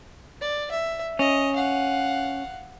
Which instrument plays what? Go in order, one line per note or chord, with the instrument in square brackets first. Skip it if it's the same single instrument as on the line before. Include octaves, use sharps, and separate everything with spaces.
[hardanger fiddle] D5
E5
[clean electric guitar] C#4 [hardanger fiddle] D#5
[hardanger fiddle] F5 F#5